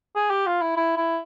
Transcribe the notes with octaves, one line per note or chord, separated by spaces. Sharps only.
G#4
G4
F4
E4
E4
E4